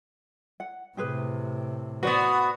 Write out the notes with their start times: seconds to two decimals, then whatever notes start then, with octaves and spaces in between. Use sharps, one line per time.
0.60 F#5
0.97 A2 C3 G4 G#4 B4
2.03 B3 F#4 B4 C5 D5